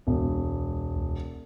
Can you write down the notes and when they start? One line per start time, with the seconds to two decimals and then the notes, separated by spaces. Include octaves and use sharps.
0.07 E1 C#2
0.95 C#2